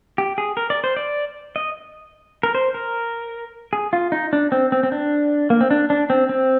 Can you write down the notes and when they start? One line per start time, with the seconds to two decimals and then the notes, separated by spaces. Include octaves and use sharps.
0.18 G4
0.38 G#4
0.57 A#4
0.70 D5
0.84 C5
0.97 D5
1.56 D#5
2.43 A#4
2.55 C5
2.74 A#4
3.73 G#4
3.93 F4
4.12 D#4
4.33 D4
4.52 C4
4.72 C4
4.83 C4
4.92 D4
5.50 A#3
5.61 C4
5.71 D4
5.90 D4
6.10 C4
6.29 C4